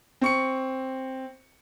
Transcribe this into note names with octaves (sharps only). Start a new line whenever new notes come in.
C4 C#6 C#7